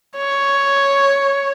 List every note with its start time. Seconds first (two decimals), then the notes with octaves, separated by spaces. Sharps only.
0.17 C#5